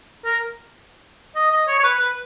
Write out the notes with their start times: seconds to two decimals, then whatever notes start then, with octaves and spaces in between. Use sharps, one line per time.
0.25 A#4
1.36 D#5
1.51 D#5
1.68 C#5
1.79 C#5
1.84 B4
1.99 B4